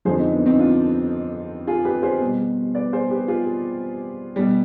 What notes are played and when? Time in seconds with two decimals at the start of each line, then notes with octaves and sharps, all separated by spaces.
0.05 F2 D3 F3 G#4 C5
0.18 C4 D#4
0.32 B3 D4
0.46 C4 D#4
0.59 D4 F4
1.67 F4 G#4
1.85 G4 B4
2.03 G#4 C5
2.20 B2
2.25 G3
2.75 B4 D5
2.93 G#4 C5
3.10 G4 B4
3.28 F4 G#4
4.36 B2 G3